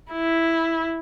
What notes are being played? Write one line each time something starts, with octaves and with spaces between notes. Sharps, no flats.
E4